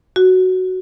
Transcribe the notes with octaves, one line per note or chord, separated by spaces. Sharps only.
F#4